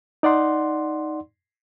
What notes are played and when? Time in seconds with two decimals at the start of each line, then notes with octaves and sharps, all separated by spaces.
0.23 D#4 D5 F#5 C6